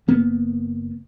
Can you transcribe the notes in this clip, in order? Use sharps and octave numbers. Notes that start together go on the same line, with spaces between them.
F#1 A#3 B3